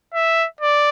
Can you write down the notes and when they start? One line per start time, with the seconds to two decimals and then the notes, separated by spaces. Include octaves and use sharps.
0.14 E5
0.61 D5